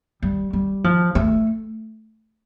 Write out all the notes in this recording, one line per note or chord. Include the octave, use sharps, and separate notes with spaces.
G3
G3
F3
A3